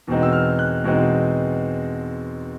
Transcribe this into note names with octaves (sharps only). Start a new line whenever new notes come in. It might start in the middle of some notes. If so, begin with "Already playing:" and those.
E2 B2 G#3 C4 D#4
E6
F6
F#6
E2 B2 G#3 C4 D#4